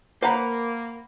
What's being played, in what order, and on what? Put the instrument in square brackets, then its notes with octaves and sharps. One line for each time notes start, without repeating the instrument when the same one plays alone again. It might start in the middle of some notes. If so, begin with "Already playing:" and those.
[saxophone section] A#3 [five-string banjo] B4 A#5 [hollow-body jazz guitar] C5 F#5 B5